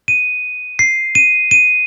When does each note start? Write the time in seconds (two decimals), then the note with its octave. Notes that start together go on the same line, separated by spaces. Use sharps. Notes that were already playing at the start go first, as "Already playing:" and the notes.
0.08 D#7
0.79 C7
1.15 D#7
1.51 D#7